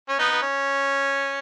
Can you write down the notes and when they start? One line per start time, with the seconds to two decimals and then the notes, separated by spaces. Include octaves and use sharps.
0.09 C#4
0.19 B3 D#4
0.32 B3
0.42 C#4